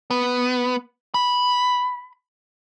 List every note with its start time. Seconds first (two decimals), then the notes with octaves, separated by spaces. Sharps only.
0.11 B3
1.14 B5